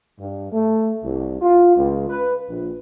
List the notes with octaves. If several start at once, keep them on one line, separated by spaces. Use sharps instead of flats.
G2
A3
C2
F4
C#2
B4
A#1